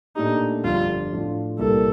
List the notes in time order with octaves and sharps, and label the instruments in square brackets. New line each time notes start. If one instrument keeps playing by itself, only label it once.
[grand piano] A#2 A3 D4 G4 [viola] D#4
[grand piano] G1 F2 D3 G3 D4 [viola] F4
[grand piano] A2 F3 A3 D4 F4
[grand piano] C2 A#2 G3 A#3 [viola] A4